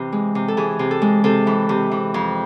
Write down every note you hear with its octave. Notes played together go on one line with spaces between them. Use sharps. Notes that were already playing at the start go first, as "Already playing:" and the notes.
Already playing: C3 E3
G#3
C3
A4
E3 G#4
C3
A4
G#3
C3 A4
E3
C3
E3
F2